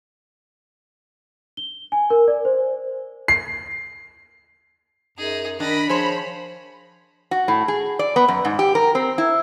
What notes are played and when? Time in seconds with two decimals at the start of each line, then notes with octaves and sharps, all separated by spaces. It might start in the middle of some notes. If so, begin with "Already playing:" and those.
1.57 G7
1.92 G#5
2.10 A#4
2.28 D5
2.45 C5
3.28 C7
5.18 F#2 D#4 G#4
5.60 D#3 D4 D#5 B5
5.89 F3 G#4 C5 C#5
7.31 F#4
7.48 A2
7.68 G#4
7.99 D5
8.16 B3
8.28 F#2
8.45 G#2
8.59 G4
8.75 A#4
8.95 C4
9.18 E4